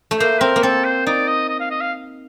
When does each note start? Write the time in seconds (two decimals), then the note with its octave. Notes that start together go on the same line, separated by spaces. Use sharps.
0.11 A3
0.19 A#3 C5
0.41 C4 A#4
0.56 A#3
0.62 C4 A4
0.85 C5
1.06 D#4 D5
1.28 D#5
1.49 D#5
1.60 F5
1.71 D#5
1.81 F5